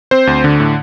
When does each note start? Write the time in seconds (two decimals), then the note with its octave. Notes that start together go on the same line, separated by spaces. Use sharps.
0.11 C4 C5
0.27 D2
0.44 D3
0.60 A2